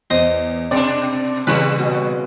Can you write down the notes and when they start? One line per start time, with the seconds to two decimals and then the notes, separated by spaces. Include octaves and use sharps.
0.10 E2 C5 D#5
0.71 B2 C4 D4 D5
1.47 A#2 C#3 E3 G3 B4 C#6
1.79 B2